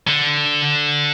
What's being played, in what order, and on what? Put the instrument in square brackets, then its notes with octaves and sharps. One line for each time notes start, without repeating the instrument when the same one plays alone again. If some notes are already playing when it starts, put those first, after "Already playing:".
[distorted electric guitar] D3